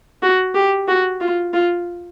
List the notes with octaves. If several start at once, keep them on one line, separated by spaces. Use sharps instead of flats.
F#4
G4
F#4
F4
F4